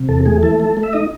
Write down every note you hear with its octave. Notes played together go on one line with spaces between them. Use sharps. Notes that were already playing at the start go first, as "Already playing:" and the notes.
Already playing: C3
E2 A4
A3 G#4
E3 A4
A3
A3
E5
D#4 D#5